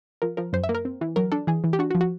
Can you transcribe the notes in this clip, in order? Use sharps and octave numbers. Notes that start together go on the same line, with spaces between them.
F3 A#4
F3 A#4
F#2 C5
E5
A#3
A#4
C4
E3
F#3 A#4
D4 A4
E3 G#4
E3
G4
D4 F#4
F#4
F3
F#4